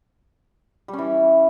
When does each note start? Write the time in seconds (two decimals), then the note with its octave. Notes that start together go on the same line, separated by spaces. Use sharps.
0.88 G3
0.93 C#4
0.99 E3